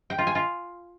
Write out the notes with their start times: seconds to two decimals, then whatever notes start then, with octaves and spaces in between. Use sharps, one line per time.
0.10 G5
0.18 F4
0.27 G#5
0.35 F4